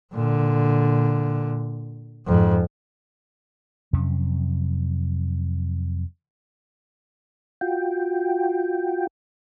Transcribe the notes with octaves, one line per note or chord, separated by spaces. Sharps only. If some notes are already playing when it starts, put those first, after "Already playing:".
A#2 D3
F2 G#2
F2 C3 F#3 C#4
F4 F#4 G5